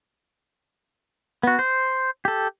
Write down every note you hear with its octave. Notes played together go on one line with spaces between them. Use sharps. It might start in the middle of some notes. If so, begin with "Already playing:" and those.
B3 F#4
C5
G4 A4